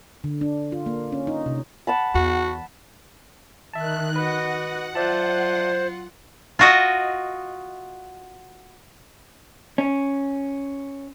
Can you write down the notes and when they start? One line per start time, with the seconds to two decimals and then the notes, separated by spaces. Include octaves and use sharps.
0.24 D3
0.41 D4
0.72 F4
0.86 A#3
1.12 C#4
1.27 D#4
1.46 C3
1.87 F#5 A5 B5
2.14 E2 F#4
3.73 D#3 E5 A5 F#6
4.16 F#4 B4 D#5 F#5
4.95 F#3 F4 C5 D5 E5 A5
6.59 F4 F#4 D#5
9.78 C#4